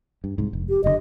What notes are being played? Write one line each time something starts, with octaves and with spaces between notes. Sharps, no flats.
G2
C2 G#2
F1
G4
F#1 A2 D3 D#5